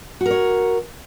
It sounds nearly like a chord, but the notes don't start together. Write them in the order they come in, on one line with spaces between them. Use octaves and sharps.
F#4 A#4 C#5